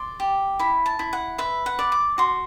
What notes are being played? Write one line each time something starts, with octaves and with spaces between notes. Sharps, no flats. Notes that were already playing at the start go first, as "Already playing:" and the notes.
Already playing: D5 C6
G4
E4 B5
A5
E4
F#5
B4 E5
F#5
D5
D6
F#4 C6